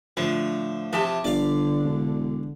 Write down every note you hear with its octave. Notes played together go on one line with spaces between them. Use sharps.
A2 D3 F3
C3 E3 F3 G4 A5
G1 D3 D5 F5
E1